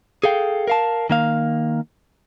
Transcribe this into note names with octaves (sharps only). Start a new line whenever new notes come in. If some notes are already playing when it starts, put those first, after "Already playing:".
G#4 A4 F5 G5
A#4 F5 A5
D#3 A#3 F5